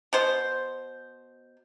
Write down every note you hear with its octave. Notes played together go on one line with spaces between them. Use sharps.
B2 C5